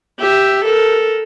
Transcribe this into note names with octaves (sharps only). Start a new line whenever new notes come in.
G4 E5
A4 A#4